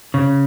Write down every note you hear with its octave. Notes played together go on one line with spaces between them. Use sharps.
C#3